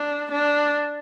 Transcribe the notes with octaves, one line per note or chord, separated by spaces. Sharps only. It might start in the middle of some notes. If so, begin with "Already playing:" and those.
Already playing: D4
D4